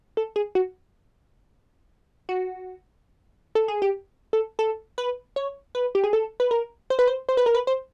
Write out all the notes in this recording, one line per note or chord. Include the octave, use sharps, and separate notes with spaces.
A4
G#4
F#4
F#4
A4
G#4
G4
A4
A4
B4
C#5
B4
G4
G#4
A4
B4
A#4
C5
B4
C5
C5
B4
A#4
B4
C5